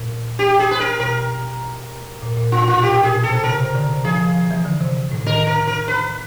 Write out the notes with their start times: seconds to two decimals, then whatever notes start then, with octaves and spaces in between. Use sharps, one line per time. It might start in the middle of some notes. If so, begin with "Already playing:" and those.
Already playing: A#2
0.39 G4
0.59 G#4
0.71 B4
0.80 A#4
1.00 B2 A#4
2.22 A#2
2.37 A#2
2.52 A#2 F4
2.67 B2 F4
2.83 A#2 G4
2.98 A#2
3.03 G#4
3.13 B2
3.23 C3 A4
3.43 C#3 A#4
3.60 C3
3.75 D3
3.89 C3
4.05 F3 G#4
4.20 F3
4.35 F3
4.51 E3
4.65 D3
4.81 C3
5.12 A2
5.27 D#3 A#4
5.47 A#4
5.67 A#4
5.88 B4